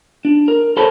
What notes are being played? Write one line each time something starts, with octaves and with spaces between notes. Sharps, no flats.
D4
A#4
A4 A#4 C5 C#5 A5 B5